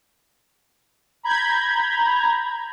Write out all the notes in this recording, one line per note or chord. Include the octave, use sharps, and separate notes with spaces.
A#5 B5 G6 G#6